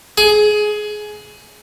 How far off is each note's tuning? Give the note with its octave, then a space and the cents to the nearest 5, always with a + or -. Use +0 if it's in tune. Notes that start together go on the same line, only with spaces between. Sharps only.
G#4 +20